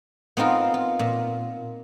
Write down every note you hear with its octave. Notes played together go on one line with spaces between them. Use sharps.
B3 C4 D#4 F4 A#4
F4
A#2